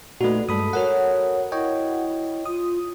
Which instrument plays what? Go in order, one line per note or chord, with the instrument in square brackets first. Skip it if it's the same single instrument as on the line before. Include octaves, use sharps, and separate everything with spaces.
[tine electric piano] A#2 D#4 B4 [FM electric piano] A3 F#4 [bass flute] D5
[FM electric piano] G2 [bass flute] G#3 [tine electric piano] A4 B5 D#6
[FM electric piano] F#4 A#4 F#5 [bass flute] C#5
[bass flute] E4 [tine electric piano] C#5 D#5 G5
[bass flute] F4 [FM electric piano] D#6